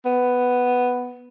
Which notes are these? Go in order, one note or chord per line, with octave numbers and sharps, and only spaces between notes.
B3